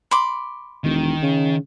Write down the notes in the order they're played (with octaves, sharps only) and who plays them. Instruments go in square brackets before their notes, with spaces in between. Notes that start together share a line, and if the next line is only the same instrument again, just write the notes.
[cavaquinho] B5 C6 D6
[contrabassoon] E1 [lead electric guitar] D#3
[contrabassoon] C#3